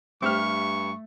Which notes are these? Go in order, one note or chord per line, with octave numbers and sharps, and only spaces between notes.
G2 A3 C4 G4 E5 C#6 F6